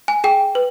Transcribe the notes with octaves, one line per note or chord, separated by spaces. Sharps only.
G#5
G#4 G5
B4